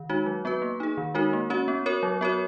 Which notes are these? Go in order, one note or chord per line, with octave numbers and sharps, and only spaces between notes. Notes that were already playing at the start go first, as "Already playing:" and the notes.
Already playing: D#3
G#3 D#4 F#4
F#3
B3 F#4 B4
A#3
D#4 G#4
D#3
G#3 D#4 F#4 A#4
A#3
C#4 F#4 C#5
B3
F#4 A#4 C#5
F#3
B3 F#4 A#4 C#5